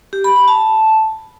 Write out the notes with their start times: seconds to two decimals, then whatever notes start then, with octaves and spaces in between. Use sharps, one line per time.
0.13 G4
0.24 B5
0.36 B5
0.48 A5